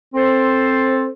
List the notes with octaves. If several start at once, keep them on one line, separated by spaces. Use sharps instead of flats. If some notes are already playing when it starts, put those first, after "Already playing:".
C4 A4 C5